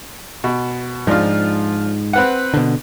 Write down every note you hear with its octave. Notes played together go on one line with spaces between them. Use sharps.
B2
G#2 F3 D4 F4
C4 B4 F#5
B2 D3